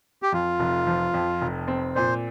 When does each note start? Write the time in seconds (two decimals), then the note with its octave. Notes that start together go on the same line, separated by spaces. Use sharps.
0.22 G4
0.32 F2 F4
0.60 F1
0.87 F3
1.14 F2
1.42 F1
1.68 C4
1.95 A#2 C5